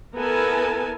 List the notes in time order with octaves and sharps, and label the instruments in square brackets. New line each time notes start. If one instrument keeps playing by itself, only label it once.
[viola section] B3 E4 A4 A#4 G#5 A5